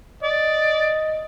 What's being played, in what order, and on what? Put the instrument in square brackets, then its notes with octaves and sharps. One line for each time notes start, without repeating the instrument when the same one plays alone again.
[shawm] D5 [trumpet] D#5